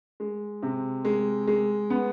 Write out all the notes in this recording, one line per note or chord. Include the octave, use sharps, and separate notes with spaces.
G#3
C3
G#3
G#3
B3